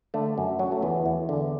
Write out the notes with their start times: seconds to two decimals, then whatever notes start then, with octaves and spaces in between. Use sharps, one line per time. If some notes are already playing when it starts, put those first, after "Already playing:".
0.14 D3 A3
0.38 F#2
0.59 F#3
0.72 A3
0.82 E2 B3
1.06 E2
1.29 D3